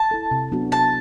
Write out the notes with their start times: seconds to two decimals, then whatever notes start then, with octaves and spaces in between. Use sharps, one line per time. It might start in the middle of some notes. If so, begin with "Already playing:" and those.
Already playing: A5
0.11 E4 A4
0.31 C3
0.52 F#3 B3 D4 F#4
0.71 C3 A5